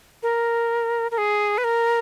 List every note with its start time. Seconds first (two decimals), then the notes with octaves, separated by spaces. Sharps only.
0.23 A#4
1.11 A#4
1.18 G#4
1.58 B4
1.64 A#4